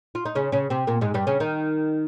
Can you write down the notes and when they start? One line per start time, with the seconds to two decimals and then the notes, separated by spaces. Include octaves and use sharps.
0.15 F4
0.25 D#4
0.35 C#3 C#4
0.52 C#3 C#4
0.70 C3 C4
0.87 A#2 A#3
1.01 G#2 G#3
1.14 G2 G3
1.27 C#3 C#4
1.40 D#3 D#4